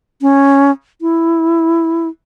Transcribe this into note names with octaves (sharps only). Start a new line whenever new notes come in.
C#4
E4